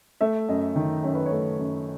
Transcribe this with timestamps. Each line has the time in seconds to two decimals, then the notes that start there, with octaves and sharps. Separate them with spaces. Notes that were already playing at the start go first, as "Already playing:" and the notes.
0.21 A3 E5
0.49 F#2 D#5
0.76 D#3
1.03 F#2 C#5
1.15 B4
1.26 C#5
1.32 A3
1.59 F#2